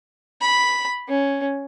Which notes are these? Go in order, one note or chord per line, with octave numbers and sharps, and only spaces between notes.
B5
C#4